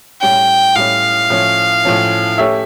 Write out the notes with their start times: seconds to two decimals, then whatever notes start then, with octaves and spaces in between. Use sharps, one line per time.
0.22 A2 G3 C#4 G5
0.76 A2 G3 C#4 F5
1.30 A2 F3 C#4
1.85 A2 F3 C#4
2.38 A3 C#4 G4 C#5 E5